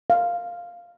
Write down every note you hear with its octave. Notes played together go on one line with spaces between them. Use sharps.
F5